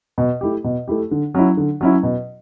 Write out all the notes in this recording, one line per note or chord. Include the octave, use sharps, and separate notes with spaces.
B2
A3 E4 G4
B2
A3 E4 G4
D3
F#3 C#4 E4
D3
F#3 C#4 E4
B2